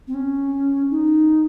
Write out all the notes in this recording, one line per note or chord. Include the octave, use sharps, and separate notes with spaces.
C4
C#4
D#4